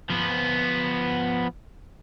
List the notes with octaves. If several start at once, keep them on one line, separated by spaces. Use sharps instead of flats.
F3 B3